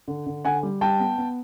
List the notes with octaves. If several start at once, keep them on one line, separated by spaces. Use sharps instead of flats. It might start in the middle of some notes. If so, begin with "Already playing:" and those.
D3
D3
D3 F#5 G#5
G3
G3 G5 A5
B3
B3